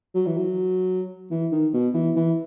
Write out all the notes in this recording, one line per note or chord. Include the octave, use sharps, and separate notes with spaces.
F#3
E3
F#3
E3
D#3
B2
E3
E3